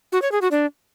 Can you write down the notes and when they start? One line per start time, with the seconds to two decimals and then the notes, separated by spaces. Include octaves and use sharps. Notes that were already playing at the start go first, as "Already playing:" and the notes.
0.12 F#4
0.22 C#5
0.32 G#4
0.41 F#4
0.51 D4